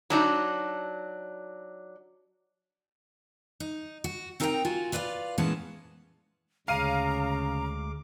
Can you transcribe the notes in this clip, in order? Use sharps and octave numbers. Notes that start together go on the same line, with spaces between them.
F#3 D4 D#4
D#4
F#4
C4 D#4 A#4 F#5 G5 A#5
F4 F#4 G#5
F4 B4 D5 E5 F5
A#2 E3 G#3 B3 C#4 A5
D2 C#3 G#3 F5 A#5 D6 D#7